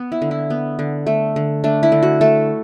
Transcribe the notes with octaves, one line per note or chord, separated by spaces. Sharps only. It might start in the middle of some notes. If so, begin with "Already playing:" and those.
Already playing: B3
E4
D3
E4
B3
D3
A3
D3
A3 D4
E4
D3
F#4
A3 A4